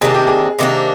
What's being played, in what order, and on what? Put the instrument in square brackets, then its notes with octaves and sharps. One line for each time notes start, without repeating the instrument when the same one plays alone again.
[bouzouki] C3 D#3 A#3 D4 [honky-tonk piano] G#4
[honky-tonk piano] G4
G#4
[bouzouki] C3 D#3 A#3 D4